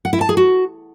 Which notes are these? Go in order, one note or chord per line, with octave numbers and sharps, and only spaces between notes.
F#5
E4
A5
G#4
F#4